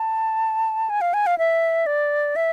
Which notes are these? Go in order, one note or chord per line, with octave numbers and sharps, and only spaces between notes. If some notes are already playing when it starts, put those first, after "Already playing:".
Already playing: A5
G#5
F5
G#5
F5
E5
D5
E5